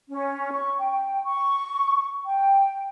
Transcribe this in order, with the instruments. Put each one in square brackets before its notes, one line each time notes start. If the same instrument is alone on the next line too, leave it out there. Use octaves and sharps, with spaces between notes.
[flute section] C#4
C#6
G5
C#6
G5